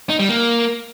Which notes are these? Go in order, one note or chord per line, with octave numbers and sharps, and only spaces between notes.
D#4
G3
A#3